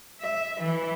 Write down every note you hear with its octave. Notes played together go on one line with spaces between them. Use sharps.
E5
E3